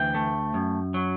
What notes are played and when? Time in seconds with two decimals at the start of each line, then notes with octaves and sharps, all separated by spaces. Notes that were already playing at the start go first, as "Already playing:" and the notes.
Already playing: D2 E3 G5
0.15 A3
0.54 F#2
0.94 F#3